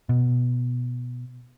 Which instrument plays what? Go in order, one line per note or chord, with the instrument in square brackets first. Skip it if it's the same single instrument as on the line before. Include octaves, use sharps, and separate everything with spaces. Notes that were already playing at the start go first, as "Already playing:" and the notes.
[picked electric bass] B2